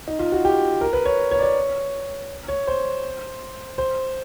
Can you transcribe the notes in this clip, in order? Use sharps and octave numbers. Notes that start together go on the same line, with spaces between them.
D#4
F4
F#4
G4
A#4
B4
C#5
C#5
D5
C#5
C#5
C5
C5